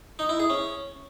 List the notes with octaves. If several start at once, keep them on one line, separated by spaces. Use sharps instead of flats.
D#4
E4
G#4
C#4